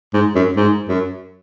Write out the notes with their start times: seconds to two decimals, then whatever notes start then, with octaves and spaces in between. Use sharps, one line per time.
0.14 G#2
0.35 F#2
0.57 G#2
0.88 F#2